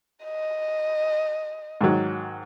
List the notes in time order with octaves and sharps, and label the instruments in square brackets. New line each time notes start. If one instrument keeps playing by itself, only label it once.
[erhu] D#5
[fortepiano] G#2 D#3 F#3